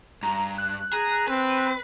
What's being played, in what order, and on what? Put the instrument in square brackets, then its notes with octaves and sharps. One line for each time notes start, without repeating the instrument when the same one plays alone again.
[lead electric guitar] G2 [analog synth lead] A#5
[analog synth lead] F#6
[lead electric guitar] G#4 [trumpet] A#5
[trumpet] C4 [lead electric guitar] B4